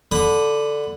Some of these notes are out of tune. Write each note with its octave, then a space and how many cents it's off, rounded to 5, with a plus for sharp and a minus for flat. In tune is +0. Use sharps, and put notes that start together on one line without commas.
D3 +0 B5 +10 D#6 +0